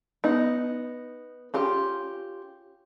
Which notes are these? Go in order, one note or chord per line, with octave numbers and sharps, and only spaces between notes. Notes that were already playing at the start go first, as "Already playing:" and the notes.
B3 D#4
C#4 F4 G4